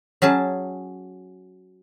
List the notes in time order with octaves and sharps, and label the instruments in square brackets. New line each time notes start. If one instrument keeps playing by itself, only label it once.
[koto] F#3 C#4 G#4 A5